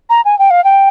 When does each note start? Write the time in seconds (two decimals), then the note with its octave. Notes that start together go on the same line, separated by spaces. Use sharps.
0.10 A#5
0.25 G#5
0.39 G5
0.51 F5
0.64 G5